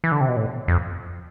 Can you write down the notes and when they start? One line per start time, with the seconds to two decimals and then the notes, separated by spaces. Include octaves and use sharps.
0.04 E3
0.12 D3
0.21 C3
0.29 B2
0.37 A2
0.68 F2